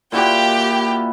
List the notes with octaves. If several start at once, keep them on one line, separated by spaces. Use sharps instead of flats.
A#2 E4 F#4 G4 G5